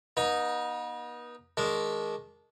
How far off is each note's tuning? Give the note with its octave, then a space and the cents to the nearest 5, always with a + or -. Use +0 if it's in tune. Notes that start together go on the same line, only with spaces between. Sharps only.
B3 -40 D#4 +0
D#3 +0 G#3 +0 D4 -20